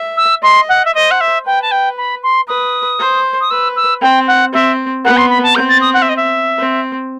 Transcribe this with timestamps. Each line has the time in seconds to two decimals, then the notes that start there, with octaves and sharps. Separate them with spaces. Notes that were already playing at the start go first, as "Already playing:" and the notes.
Already playing: E5
0.17 E6
0.43 D#5 C6
0.69 F#5
0.85 E5
0.94 C5 D#5
1.11 F#5
1.20 E5
1.45 B4 G5
1.62 A5
1.71 G5
1.97 B5
2.23 C6
2.48 B4 D#6
2.99 C5
3.41 D#6
3.50 B4 E6
3.76 E6
4.01 C4 G5
4.27 F#5
4.53 C4 E5
5.04 B3 F#5
5.17 C6
5.29 B5
5.43 A5
5.55 C4 G6
5.68 A6
5.81 D#6
5.94 F#5
6.02 E5
6.09 D#5
6.16 E5
6.58 C4